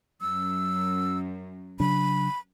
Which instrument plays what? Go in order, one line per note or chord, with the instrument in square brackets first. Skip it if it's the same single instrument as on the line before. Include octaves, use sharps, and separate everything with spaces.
[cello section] F#2 [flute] E6
[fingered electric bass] C#3 F#3 D4 [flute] B5